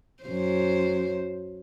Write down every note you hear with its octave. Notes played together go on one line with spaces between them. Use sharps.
F#2 C5